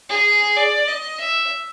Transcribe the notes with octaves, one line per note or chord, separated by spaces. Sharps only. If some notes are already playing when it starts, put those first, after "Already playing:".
G#4
D5
D#5
E5